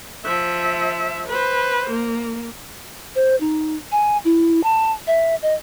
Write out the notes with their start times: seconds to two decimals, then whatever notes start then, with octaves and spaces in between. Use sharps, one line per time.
0.25 F3 E5
1.27 B4 C5
1.90 A#3
3.15 C5
3.40 D#4
3.92 G#5
4.25 E4
4.64 A5
5.07 E5
5.42 D#5